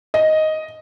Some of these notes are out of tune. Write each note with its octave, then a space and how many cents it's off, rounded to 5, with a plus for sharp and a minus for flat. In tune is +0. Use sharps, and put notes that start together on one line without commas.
D#5 +5